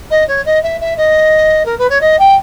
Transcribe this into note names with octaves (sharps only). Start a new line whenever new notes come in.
D#5
C#5
D#5
E5
E5
D#5
A#4
B4
C#5
D#5
G5